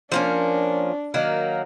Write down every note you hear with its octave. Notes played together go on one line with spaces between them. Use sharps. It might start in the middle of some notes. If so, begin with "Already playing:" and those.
F3 A#3 C#4 D4
D#3 F#3 A#3 A#4